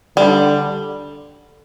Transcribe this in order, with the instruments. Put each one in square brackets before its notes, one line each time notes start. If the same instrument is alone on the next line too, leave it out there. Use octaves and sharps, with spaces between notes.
[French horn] D3 [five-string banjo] G3